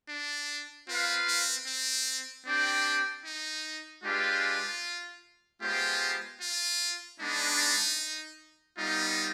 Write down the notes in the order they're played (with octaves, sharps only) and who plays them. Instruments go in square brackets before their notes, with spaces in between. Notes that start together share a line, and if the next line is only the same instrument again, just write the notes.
[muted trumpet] D4
[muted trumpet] C4 [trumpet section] F4 B4 F5
[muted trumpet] C4
C4
[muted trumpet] C4 [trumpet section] D4 G4 D5 G5
[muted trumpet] D#4
[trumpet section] G#3 D4 G4 B4 F5 [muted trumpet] F4
[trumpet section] G#3 B3 F4 C5 G5 [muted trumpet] G4
[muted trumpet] F4
[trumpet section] G#3 B3 D4 [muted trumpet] D#4
[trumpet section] G3 B3 D#4 [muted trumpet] F4